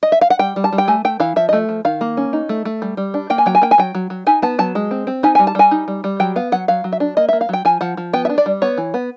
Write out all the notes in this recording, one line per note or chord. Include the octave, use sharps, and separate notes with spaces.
D#5
E5
F5
F#5
G3 G5
G3
A5
G3
G5
A3 G#5
A3 G5
E3 F5
F3 E5
D#5
A3
F3
D#3 F5
A#3
C#4
D#4
A3
A3
G3
G3
D4
A#3 G5
G#5
F#3 G5
G#5
A#3 G5
G#5
F#3 G5
F#3
F#3
D#4 G#5
B3 A5
F#3 A5
G#3
C4
C4
D#4 G#5
G#5
G3
A5
G3 G#5
D#4
G3
G3
F#3 G5
B3 F5
F#3 F#5
F#3 F5
F#3
E5
D4
A#3 D#5
E5
A#3
F5
F#3 G5
F3 G#5
F3 F#5
F3
B3 G5
E5
D4
D5
G3
B3 C#5
E3
B3